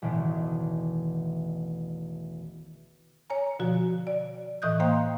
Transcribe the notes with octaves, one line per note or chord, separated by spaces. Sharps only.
E1 A1 D#3
C#5 G#5 A#5
B2 D3 F3 F#4
D5
A2 E3 D#5 D#6 F#6 G6
A#3 C5 F5 G5 A#5 C6